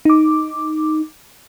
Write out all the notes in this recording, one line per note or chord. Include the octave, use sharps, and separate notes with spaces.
D#4 D6